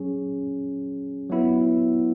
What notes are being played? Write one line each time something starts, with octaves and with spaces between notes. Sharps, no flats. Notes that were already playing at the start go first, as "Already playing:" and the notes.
Already playing: F#3 C#4 G#4
F#3 B3 E4